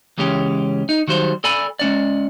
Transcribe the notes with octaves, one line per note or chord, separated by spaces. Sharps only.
C#2 E3 G#3 C#4 G4
D#4
D#3 F#3 G3 C5
A4 D5 G#5 B5
G#3 C#4 D5